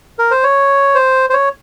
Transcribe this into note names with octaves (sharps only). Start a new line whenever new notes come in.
A#4
C5
C#5
C5
C5
C#5